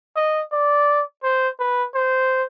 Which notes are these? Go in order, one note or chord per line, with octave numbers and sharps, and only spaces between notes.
D#5
D5
C5
B4
C5